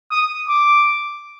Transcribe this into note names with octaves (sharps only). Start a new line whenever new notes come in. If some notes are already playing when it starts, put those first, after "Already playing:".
D#6
D6